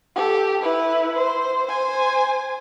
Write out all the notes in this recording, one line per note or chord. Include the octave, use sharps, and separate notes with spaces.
G4 A4
E4 B4
C5
C5 G#5